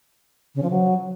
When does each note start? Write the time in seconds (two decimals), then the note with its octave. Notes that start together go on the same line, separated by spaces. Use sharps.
0.55 C#3
0.63 F3
0.70 F#3